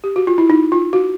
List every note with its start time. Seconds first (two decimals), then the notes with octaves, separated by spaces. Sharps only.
0.04 G4
0.16 F#4
0.27 F4
0.38 E4
0.50 D#4
0.72 F4
0.93 F#4